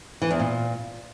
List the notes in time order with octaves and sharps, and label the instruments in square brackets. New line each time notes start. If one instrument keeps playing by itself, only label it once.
[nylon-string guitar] E3
E2
A#2